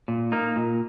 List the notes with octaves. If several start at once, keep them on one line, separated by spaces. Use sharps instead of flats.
A#2
A#3 D#4
A#2